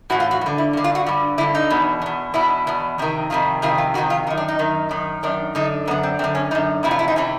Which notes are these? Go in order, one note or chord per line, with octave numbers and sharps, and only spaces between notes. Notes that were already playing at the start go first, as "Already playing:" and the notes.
A2 E3 F#4
F4
F#4
G2 D3
E4
G2 D3
F4
F#4
G2 D3
G2 D3 E4
D#4
E2 B2
E2 B2
E2 B2 E4
E2 B2
F2 C3 D#3
F2 C3 D#3 F4
F2 C3 D#3 F4
F4
F2 C3 D#3 F#4
F4
F#2 D#3 D#4
D4
D#4
F#2 D#3
F#2 D#3
F#2 D#3 D4
F#2 D3 D#4
F#2 D3 B3
C4
F#2 D3 C4
C#4
F#2 D3 D#4
F2 C3 E3 E4
F4
E4
D#4
C3 E3 C#4